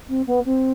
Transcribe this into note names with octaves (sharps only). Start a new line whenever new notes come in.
C4
B3
C4